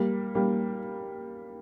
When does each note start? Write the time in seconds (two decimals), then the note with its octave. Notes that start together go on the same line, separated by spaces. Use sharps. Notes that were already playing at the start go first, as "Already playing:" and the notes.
Already playing: G3 A#3
0.35 G3 A#3